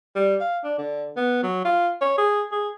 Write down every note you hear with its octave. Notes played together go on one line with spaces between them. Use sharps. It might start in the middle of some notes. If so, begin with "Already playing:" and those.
G3
F5
D4
D3
B3
F#3
F4
C#5
G#4
G#4